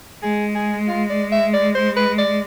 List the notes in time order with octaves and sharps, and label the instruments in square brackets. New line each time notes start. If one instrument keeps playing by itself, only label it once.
[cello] G#3 [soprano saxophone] G#4
[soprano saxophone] G#4
F4
D5
E5
D5
C5
B4
D5